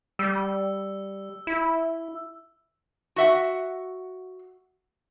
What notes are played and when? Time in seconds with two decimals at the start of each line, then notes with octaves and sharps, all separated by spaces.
0.19 G3 E6
1.47 E4
3.16 F#4 E5 F#5